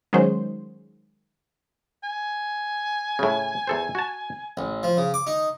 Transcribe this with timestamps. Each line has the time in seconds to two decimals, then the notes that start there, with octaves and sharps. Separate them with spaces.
0.13 D#3 F#3 G#3 C#4 C5
2.03 G#5
3.19 A2 C#3
3.67 E2 A4 C5
3.95 F#4 A5
4.57 A1
4.83 F3
4.97 C#3
5.14 D6
5.27 D#4